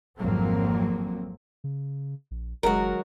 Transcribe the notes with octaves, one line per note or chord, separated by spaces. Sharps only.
G#1 F2 F#3 A#3 C4
C#3
A#1
F#1 D#3 F#3 G#3 F#4 A#4